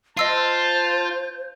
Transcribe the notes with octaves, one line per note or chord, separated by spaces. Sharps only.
F4 C5 D#5 A5 E6 C7